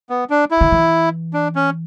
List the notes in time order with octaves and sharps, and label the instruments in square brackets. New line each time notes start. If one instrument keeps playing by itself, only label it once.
[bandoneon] B3
D4
E4
[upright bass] D3
E3
[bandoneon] D4
C#4